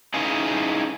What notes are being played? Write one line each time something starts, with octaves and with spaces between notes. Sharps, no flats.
C#4 D#4 E4 G#4 B4 F5